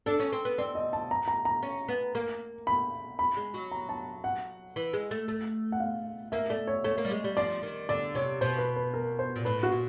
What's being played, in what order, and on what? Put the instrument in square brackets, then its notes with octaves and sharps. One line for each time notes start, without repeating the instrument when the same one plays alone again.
[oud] D4 [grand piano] A4
[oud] C#4
C4
B3
[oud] C4 [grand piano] D5
[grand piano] D#5
A5
A#5
A#5
A#5
[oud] C#4
B3
A#3
[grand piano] B5
B5
[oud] G#3
F#3
[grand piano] A#5
A5
F#5
[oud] E3
G#3
A3
A3
[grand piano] F#5
F5
[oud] A#3 [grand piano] E5
[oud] A3 [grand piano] D5
[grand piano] C#5
[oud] A3 [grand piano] C#5
[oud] A#3
G3
G#3
G3
[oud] F3 [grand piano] D5
[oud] D#3
[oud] D3 [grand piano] D5
[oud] C3 [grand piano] C#5
[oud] B2 [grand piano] C5
[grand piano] B4
B4
A#4
C5
[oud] A#2
[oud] A2 [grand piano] B4
[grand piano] F#4
[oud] A#2